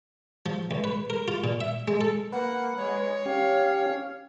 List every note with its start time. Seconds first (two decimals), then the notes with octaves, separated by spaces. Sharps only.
0.46 F3
0.71 C#2
0.84 B4
1.10 A#4
1.28 F4
1.44 A#2
1.61 E5
1.88 G#3
2.01 A4
2.32 A#3 B4 F#5
2.77 G#3 C#5
3.26 C#4 G4 F5